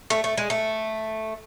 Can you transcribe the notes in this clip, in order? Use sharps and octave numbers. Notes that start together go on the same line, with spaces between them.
A3
A3
G#3
A3